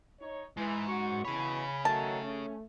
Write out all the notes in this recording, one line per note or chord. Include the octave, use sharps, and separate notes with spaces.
D#4 C#5
G#2 E3
F#2 F#4 C#6
B2 E3 G#4 C#5 B5
D#3 F#3 A3 A5
C#4